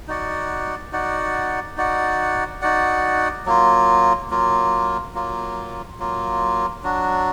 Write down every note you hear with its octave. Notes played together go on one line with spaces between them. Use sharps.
D#4 F#4 D5 F#5
D#4 F#4 D5 F#5
D#4 F#4 D5 F#5
D#4 F#4 D5 F#5
F#3 A#3 F4
F#3 A#3 F4
F#3 A#3 F4
F#3 A#3 F4
F#3 D4 F#4